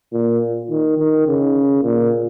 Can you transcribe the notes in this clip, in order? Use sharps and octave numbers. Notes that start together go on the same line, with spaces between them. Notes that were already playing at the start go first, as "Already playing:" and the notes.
A#2
D#3
D#3
C#3
A#2